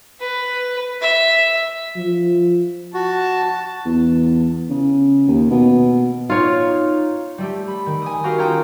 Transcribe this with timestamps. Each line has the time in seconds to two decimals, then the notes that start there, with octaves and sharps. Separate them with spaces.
0.20 B4
1.01 E5
1.96 F3
2.94 F#4 A5
3.85 E2
4.70 C#3
5.28 D#2
5.50 B2
6.30 D#4 F4 C#5
7.38 G3 A3 G4
7.68 B5
7.86 D#3
8.02 G#5 D#6
8.24 F#4 G4 A#4 F5
8.38 C#4 F4 G#4 A4 G5 A#5